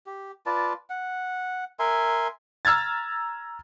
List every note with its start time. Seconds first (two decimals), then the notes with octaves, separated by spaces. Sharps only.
0.06 G4
0.46 F4 B4 D5 A5
0.90 F#5
1.79 A#4 E5 G#5 C6
2.65 A#5 E6 F6 G#6 A6